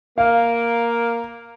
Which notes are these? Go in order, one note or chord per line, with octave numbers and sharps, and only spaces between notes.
A#3 F5